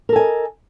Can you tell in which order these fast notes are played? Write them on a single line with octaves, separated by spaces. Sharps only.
A#4 A4 G#5 D#5